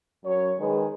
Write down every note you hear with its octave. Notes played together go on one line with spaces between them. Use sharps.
F#2 C#5
D#3 G#3 G#4 B4